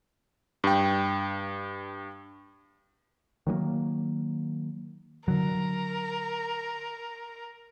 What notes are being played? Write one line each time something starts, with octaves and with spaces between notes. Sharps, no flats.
G2 G5
D#3 F#3 G3 A#3
D3 F#3 A#4